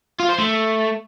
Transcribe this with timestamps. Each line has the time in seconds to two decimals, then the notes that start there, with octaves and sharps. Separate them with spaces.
0.20 F4
0.29 C5
0.38 A3